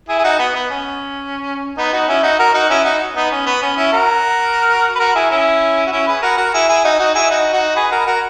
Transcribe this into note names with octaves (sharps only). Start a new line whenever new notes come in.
E4 G#4
G#4
D#4 F#4
B3
B3
C#4
B3 D#4
D#4 F#4
C#4 E4
D#4 F#4
F#4 A#4
D#4 F#4
C#4 E4
D#4 F#4
B3 D#4
C#4
B3
C#4
C#4 E4
F#4 A#4
B4
F#4 A#4
E4 G#4
C#4 E4
F#4
C#4 E4
G#4 B4
F#4 A#4
F#4 A#4
E4 G#4
E4 G#4
D#4 F#4
D#4 F#4
E4 G#4
D#4 F#4
D#4 F#4
G#4 B4
F#4 A#4
F#4 A#4